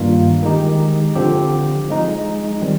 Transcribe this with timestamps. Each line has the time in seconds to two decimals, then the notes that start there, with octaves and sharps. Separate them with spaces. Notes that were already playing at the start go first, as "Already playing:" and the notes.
Already playing: G2 D#3 G3 A#3 F4
0.43 D#3 G#3 D#4 G4
1.15 D3 F3 C4 G4
1.88 F3 G#3 D#4
2.62 D#3 G3 C4